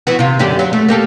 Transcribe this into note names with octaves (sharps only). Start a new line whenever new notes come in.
E3 B3 F#4
C3 F4
F#2 D3 G4
F#3
A3
A#3 G4 A4